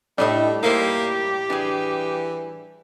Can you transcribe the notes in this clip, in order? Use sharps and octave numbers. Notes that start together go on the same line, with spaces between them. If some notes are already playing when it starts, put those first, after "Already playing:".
A2 G3 A3 D4 D#4 D#5
A#3 D#4 E4 G4 C5
E3 D4 G#4